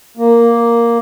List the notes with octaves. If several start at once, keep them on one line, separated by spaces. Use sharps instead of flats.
A#3